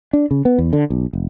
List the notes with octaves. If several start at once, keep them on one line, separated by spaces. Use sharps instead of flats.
D4
C#3
B3
E2
D3
B1
F1